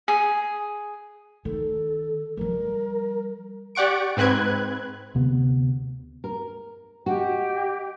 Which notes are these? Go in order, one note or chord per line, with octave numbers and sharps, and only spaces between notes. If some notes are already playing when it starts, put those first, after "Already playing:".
G#4
D#3 A4
F3 G3 A#4
G4 D5 F#5 C#6 D7
G#2 C4 B4 F#6 G#6
D2 C3 B3
A#4
F#4 G4 D#5 G5